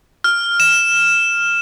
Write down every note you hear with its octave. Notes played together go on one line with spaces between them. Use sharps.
F6
E7